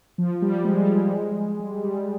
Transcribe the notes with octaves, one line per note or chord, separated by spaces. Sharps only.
F3
G3
G#3
G3
G#3
G3
G3